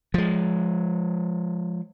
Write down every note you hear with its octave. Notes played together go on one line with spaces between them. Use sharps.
F3 G#3